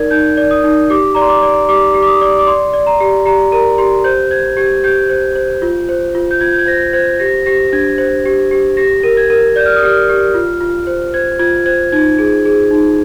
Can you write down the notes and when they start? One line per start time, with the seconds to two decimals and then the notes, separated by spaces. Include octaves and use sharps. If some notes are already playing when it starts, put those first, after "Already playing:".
Already playing: D#4 A#4 D5 G#6
0.11 D#4 G6
0.37 D5
0.51 D#6
0.64 D#4
0.90 G4 D6
1.15 D5 A#5
1.21 C6
1.29 D6
1.43 D5
1.69 G4 D6
1.94 G4
2.02 D6
2.07 D#6
2.21 D5
2.39 D6
2.47 D5 C6
2.74 D5
2.87 A#5
3.00 G4
3.25 G4 A#5
3.52 A#4 A#5
3.78 G4 C6
4.04 C5 G6
4.30 C5 G#6
4.57 G4 G#6
4.84 G4 G6
5.09 C5
5.35 C5
5.62 F4
5.89 C5
6.15 F4
6.31 G6
6.41 F4 G#6
6.53 G6
6.59 G#6
6.67 C5 A#6
6.93 C5 G#6
7.19 G4 A#6
7.46 G4 A#6
7.73 D4 G#6
7.98 C5
8.25 G4
8.51 G4
8.77 G4 A#6
9.03 A#4
9.17 G#6
9.30 A#4
9.56 D5 G6
9.66 F6
9.76 D#6
9.83 G4 F6
10.09 G4
10.34 F4
10.61 F4
10.87 C5
11.14 C5 G#6
11.39 F4 G#6
11.66 C5 G#6
11.92 D#4 G#6
12.18 G#4
12.45 G#4
12.71 D#4